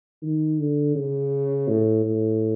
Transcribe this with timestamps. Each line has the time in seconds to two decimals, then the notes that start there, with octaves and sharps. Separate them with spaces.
0.22 D#3
0.59 D3
0.95 C#3
1.68 A2
2.05 A2